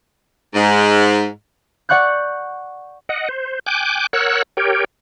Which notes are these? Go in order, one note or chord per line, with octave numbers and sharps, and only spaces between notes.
G#2
D5 F#5 C#6 F#6 G6
D#5 F#5
C5
G5 G#5 D6 F#6 G6
A#4 C#5 F#5 E6 F#6
G4 A#4 C#5 G5